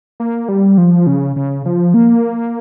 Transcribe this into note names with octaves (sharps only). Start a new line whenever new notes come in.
A#3
G3
F3
C#3
C#3
F3
A#3